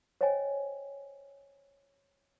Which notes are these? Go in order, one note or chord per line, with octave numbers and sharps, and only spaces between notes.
C5 C#5 D#5 G5 G#5